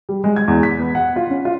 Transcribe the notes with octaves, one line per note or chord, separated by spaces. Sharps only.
G3
G#3
G#6
E2
B6
B3
F#5
F4
C#4
F4